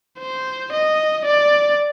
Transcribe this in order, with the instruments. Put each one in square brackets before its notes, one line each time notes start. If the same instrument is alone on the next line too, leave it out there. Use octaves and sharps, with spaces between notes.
[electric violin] C5
D#5
D5